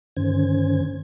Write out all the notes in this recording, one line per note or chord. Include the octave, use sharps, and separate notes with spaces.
G2 D3 D#3 C#4 C5 G#6